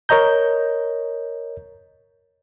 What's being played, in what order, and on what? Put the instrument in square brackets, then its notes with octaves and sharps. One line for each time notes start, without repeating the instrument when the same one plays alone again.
[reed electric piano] A#4 C#5 D#5 A#5 G6